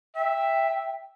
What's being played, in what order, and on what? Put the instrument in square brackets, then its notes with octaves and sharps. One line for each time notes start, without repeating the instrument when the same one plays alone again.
[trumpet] E5 [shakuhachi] G5